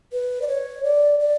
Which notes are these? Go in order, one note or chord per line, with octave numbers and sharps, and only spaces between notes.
B4
D5
C#5
D5
D5